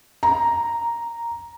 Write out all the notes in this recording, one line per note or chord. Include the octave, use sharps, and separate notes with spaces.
A#5